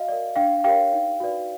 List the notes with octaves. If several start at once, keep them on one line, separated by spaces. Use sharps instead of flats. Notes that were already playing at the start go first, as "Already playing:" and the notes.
Already playing: F#4 D#5 F5
A#4 D5
D4 F5 G5
G4 A#4 C#5 F5 G5
D#4
F#4 B4 D5